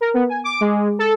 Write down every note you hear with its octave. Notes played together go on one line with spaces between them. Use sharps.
A#4
B3
G#5
D6
G#3
A4